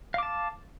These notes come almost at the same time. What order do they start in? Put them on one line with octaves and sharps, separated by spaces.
F5 D6 A5